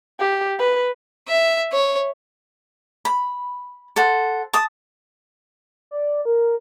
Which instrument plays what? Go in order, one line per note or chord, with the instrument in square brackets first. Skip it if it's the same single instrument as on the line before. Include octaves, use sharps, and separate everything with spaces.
[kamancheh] G4
B4
[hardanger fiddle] E5
C#5
[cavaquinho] B5
A4 C5 F#5
A5 D#6
[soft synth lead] D5
A#4